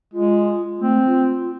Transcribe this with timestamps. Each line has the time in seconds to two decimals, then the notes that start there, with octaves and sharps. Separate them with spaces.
0.14 G#3 F4
0.80 A3 C4
1.07 F4